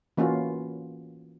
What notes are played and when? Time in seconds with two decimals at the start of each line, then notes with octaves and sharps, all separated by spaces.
0.17 E3 A#3 C#4 F4 F#4